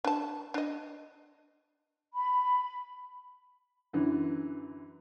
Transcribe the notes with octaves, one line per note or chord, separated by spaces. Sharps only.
D4 A5
D4 D#5
B5
F#2 D3 E3